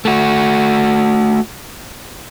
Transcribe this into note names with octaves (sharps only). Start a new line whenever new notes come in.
A3 F#4